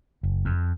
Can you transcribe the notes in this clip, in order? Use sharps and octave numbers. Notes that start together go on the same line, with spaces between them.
F#1
F2